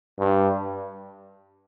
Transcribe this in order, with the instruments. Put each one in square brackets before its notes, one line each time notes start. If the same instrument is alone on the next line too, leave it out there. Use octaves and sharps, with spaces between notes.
[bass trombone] G2